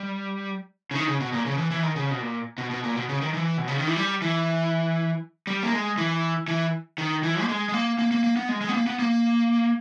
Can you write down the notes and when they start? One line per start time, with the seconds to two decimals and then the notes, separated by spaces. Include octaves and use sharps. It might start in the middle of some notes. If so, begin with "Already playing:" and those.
Already playing: G3
0.91 C#3
0.95 D#3
1.08 C#3
1.20 B2
1.33 A#2
1.46 C#3
1.58 E3
1.71 E3
1.83 D#3
1.96 C#3
2.11 B2
2.21 A#2
2.58 B2
2.71 B2
2.84 A#2
2.96 B2
3.09 C#3
3.21 D#3
3.34 E3
3.58 B2
3.68 C#3
3.77 D#3
3.87 E3
3.96 G3
4.22 E3
5.47 G3
5.63 A#3
5.73 G#3
5.98 E3
6.48 E3
6.98 D#3
7.23 E3
7.41 A#3
7.49 G#3
7.69 G#3
7.74 A#3
7.99 A#3
8.11 A#3
8.24 A#3
8.36 B3
8.49 G#3
8.61 G#3
8.69 B3
8.74 A#3
8.87 B3
8.99 A#3